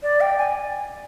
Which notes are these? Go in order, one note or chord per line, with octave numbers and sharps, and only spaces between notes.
D5
G5
G#5